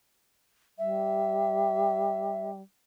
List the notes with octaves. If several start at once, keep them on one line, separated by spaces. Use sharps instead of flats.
G3 E5